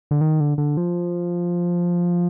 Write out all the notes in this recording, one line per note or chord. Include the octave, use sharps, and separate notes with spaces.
D3
D#3
D3
D3
F3